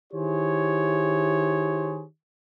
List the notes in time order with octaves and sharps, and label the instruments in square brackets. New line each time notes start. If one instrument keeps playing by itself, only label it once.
[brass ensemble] D#3 E4 G4 G#4 C5 C#5